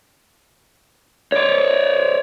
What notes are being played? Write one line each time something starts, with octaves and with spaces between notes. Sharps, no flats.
C#5 D5